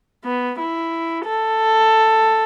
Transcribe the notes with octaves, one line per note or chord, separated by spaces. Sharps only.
B3
E4
A4